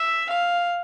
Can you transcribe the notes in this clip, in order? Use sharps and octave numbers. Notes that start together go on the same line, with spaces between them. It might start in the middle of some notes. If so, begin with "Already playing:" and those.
Already playing: E5
F5